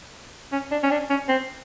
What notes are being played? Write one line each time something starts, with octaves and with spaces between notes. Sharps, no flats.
C#4
D4
C#4
D4
C#4
C4